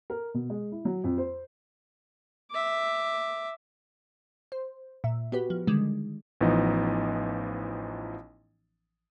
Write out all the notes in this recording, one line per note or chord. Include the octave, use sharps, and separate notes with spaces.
A#4
B2
G#3
E4
F#3
F2
C5
E5 D6
C5
A#2 E5
B3 F#4 G4 B4
F3
D3 D#3 G3 G#3
A1 E3 F3 B3 D#4 D#5